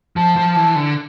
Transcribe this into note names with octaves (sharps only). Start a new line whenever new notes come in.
F3 A5
F3
E3
D3